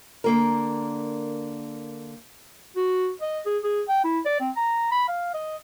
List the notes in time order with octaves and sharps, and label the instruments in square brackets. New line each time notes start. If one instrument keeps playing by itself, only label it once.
[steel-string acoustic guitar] D3 A#3 A#4
[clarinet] F#4
D#5
G#4
G#4
G5
E4
D5
C4
A#5
B5
F5
D#5